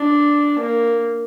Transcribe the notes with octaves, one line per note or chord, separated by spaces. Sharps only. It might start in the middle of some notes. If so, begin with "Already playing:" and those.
Already playing: D4
A#3